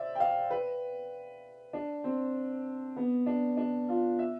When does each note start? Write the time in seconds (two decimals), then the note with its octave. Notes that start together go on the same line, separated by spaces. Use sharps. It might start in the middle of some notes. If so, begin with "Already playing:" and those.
Already playing: C5 D5 E5
0.15 G5
0.20 F5
0.50 B4
1.73 D4
2.04 C4
2.96 B3
3.26 D4
3.57 D4
3.89 F4
4.19 E5